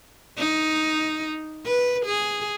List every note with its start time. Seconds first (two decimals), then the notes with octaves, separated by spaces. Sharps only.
0.38 D#4
1.66 B4
2.05 G#4